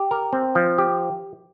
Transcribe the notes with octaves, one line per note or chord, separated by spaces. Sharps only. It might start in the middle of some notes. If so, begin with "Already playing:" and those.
Already playing: G4
A#4
C4
F3
G4